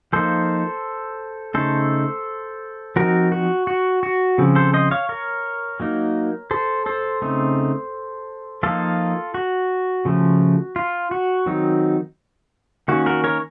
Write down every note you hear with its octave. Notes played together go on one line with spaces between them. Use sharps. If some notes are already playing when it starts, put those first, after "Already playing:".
F3 A#3 D#4 A4 C5
C#3 A3 D#4 A4 C5
F3 C4 D#4 F#4 A#4
F#4
F#4
F#4
C#3 F3 C4
A4 C5
C5 D#5
C#5 F5
A#4 C#5
F#3 A#3 D#4
A4 C5
A4 C5
C#3 A3 C4 D#4
F3 A#3 D#4 F4 A4
F#4
C#3 F3 A3
F4
F#4
D#3 F#3 C4 D#4
D#3 A#3 C#4 F#4
F#4 A#4
A#4 C#5